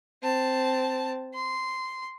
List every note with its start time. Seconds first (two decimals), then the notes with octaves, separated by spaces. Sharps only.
0.22 C4 A5
1.34 C6